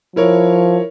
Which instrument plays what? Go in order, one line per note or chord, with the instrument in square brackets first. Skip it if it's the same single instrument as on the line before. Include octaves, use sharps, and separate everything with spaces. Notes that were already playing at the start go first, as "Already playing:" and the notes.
[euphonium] F3 [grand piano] E4 A#4 C#5